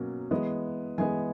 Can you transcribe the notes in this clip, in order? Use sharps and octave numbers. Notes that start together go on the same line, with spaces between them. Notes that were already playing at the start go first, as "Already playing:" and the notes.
Already playing: B2 F#3 A#3 C#4
E3 G#3 B3
E3 G#3 B3 G#5